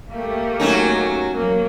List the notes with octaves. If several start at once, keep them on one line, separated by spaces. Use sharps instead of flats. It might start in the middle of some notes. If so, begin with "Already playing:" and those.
A3 A#3 G4
F#3 C#4 D#4
F#3 A#3